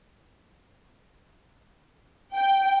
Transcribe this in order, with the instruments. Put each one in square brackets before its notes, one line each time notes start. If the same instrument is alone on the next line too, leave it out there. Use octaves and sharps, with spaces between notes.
[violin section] G5